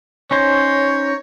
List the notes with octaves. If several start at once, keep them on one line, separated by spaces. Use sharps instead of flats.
C#4 D#4 C5 C#5